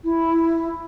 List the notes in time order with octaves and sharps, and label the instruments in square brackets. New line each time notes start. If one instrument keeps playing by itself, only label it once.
[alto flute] E4